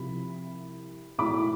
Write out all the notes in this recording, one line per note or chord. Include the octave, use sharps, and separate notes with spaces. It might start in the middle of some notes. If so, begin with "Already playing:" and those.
Already playing: C2 C3 F3 B5
B1 A2 E3 B5 D6